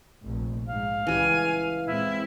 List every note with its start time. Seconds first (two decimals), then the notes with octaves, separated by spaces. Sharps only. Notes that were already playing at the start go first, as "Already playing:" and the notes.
0.22 F1 A#1
0.69 G#2 F5
1.07 C#2 C#3 E3 G3 G#5
1.86 A#2 G#3 C4 E4